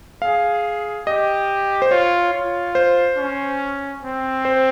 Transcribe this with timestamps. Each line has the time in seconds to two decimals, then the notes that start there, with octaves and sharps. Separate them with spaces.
0.22 G#4 F5
1.06 G4 D#5
1.82 C5
1.91 F4 C#5
2.33 F4
2.75 C5
3.17 C#4
4.03 C4
4.45 C5